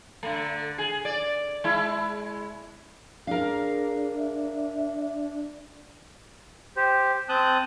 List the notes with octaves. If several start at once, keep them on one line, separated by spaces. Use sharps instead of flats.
D3 A3
G#4
D5
G#3 E4
D4 G#4 A#4 F5
E5
G4 C5
C4 A5 D#6 F#6 G6